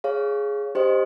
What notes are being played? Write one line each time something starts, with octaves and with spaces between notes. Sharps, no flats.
G#4 C#5 F5
D4 G4 C5 D#5